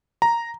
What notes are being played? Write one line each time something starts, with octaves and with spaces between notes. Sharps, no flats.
A#5